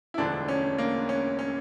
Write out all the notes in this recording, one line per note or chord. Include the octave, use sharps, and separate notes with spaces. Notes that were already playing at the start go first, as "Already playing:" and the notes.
E4
E1 D2 D3 F3 D4
C#4
A#3
C#4
C#4